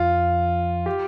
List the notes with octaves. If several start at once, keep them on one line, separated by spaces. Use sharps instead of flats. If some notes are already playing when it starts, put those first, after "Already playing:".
Already playing: F2 F4
G4